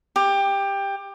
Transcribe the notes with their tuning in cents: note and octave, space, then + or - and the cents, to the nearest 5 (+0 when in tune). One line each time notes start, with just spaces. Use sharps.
G4 +15